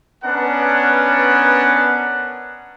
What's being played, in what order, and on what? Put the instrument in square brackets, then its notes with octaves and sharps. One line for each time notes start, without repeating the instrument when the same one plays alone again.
[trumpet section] B3 C#4 D4 A#4 B4 F#5